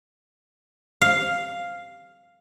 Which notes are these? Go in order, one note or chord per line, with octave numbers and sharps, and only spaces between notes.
F5